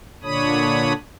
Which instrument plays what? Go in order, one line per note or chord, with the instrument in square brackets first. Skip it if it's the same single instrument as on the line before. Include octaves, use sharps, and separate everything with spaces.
[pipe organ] A#2 D3 D4 C#5 B5 D#6